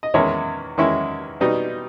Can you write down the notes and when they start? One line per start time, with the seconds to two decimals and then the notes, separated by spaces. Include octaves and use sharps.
0.03 D#5
0.14 E2 D#3 G#3 C#4 E4 C#5
0.77 E2 D#3 G#3 C#4 E4
1.41 B2 G3 B3 D#4